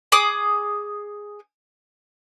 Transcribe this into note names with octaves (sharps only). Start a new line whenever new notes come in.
G#4 D6 D#6